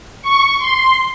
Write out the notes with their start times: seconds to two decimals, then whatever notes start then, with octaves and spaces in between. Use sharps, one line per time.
0.22 C#6
0.58 C6